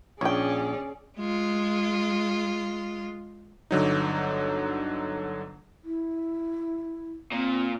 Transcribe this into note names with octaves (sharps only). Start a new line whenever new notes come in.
A#1 C#4 G#4 C#5 D5 G5
G#3 F4
G1 D3 F#3 D#4
E4
A#2 C4